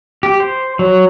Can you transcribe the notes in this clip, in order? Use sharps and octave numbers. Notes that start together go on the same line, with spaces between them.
G4
C5
F#3